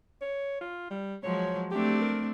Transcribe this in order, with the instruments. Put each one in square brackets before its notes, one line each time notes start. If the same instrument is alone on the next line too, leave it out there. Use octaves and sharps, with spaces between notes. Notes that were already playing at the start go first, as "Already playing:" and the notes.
[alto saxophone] C#5
F4
G3
[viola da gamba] F3 F#3 G#3 [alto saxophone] C#5
[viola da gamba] A3 C4 D4 [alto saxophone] G4
[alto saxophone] A#4